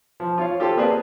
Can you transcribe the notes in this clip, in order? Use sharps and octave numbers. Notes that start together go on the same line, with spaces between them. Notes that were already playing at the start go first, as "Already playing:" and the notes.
F3
F4 C#5 F5
F4 G4 A4 C5 A5
A#3 C4 G#4 B4 D5 A5